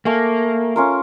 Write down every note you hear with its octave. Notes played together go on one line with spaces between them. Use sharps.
A3 A#3 G#5
C#4 F4 A#4